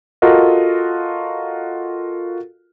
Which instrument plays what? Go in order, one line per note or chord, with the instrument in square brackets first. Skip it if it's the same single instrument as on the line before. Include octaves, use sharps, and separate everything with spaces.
[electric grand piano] F4 F#4 A4 A#4 D#5